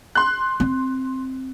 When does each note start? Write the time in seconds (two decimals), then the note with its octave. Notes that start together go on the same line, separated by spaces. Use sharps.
0.15 C6 F#6
0.60 C4